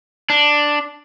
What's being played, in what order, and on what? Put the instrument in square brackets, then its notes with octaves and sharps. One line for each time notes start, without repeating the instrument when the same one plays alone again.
[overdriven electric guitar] D4